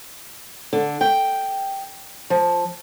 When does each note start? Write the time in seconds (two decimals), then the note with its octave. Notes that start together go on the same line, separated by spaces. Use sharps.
0.73 D3
1.01 G5
2.30 F3